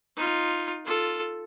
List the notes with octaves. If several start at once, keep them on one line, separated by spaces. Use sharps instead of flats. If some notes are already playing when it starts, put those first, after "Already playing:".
D#4 F4
F4 A4